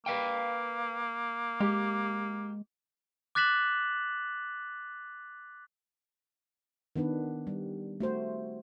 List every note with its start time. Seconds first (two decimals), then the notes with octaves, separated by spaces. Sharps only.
0.06 A#3 B4 F5 G5
1.60 G#3 G4
3.35 D6 F#6 A6 B6 E7 F#7
6.96 D#3 B3 D4 B4
7.47 G3
8.00 A3 F#4 C5